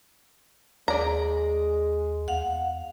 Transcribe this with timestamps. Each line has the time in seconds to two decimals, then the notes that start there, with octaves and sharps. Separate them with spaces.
0.88 D#2 G#3 D5 A#5
2.28 E2 F5 F#5